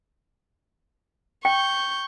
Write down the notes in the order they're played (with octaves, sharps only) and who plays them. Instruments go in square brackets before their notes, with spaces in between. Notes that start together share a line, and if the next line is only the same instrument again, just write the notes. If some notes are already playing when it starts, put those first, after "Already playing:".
[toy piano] G5 [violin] C#6 G6